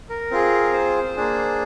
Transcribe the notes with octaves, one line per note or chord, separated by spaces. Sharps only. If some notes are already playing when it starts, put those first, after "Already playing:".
A#4
C4 F4 G#4
C5
A#3 D4 G#4